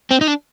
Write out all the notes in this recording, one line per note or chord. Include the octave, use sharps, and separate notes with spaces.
C4
D#4
D4